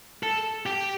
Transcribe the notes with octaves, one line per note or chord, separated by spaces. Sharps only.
A4
G4